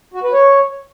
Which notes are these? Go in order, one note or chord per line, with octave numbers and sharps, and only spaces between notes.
F#4
B4
C#5